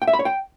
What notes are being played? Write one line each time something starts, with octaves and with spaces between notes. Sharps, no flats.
G5
E5
B5
C#5
G5